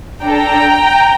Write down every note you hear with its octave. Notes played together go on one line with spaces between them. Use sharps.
D4 A4 G5 A#5